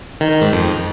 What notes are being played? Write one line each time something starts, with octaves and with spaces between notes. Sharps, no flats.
D#3
D#3
G#2
F2